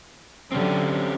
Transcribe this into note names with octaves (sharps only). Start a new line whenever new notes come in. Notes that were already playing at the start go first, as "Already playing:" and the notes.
D3 F#3 C4 C#4 G4